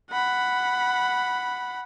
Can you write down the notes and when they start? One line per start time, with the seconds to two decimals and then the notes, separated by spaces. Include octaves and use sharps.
0.11 F#5 B5